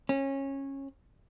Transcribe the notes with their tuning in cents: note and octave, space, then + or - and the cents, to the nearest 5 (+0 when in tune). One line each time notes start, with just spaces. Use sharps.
C#4 -20